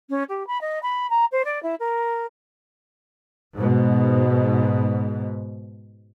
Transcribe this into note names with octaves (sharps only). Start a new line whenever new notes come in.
C#4
G4
B5
D#5
B5
A#5
C5
D5
E4
A#4
G#2 B2